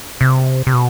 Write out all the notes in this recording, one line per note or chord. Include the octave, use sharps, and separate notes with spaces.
C3
C3
B2